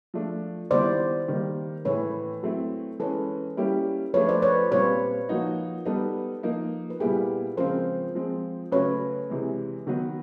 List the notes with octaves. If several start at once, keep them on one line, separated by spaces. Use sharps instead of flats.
F3 A3 D4
D#3 G3 B3 E4 C5 D5
D#3 G3 A#3
A2 E3 A3 B4 C#5
F#3 A3 C4 E4
E3 G#3 C#4 A4 B4
G3 A#3 C#4 E4 G4
F3 A3 D4 B4 C#5
C5 D5
B4 C#5
A#2 G3 C4 F4 B4 C#5
F3 A#3 D#4 F#4
G3 B3 D#4 A4 B4
F3 A#3 D#4
B4
A#2 G3 B3 E4 G4 G#4 A#4
C#3 F3 G#3 C4 F4 A#4 C5
F3 G#3 C4
C#3 F#3 A3 B4 C#5
C3 E3 G#3
D#3 F#3 B3